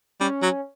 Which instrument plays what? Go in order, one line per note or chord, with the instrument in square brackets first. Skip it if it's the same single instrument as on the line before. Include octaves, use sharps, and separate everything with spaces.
[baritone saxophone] G3 [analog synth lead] C#4
[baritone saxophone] F#3